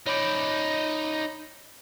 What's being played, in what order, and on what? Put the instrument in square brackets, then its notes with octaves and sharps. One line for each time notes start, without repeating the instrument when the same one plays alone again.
[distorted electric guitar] D#4 D5 [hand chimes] C#5 B5 G6